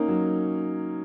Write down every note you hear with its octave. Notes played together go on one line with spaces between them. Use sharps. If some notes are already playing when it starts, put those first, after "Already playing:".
Already playing: A#3 C#4 D#4
F#3